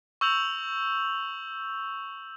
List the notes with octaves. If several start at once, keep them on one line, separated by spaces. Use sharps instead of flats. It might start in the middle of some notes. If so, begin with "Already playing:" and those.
C#6 E6 G6 F7 F#7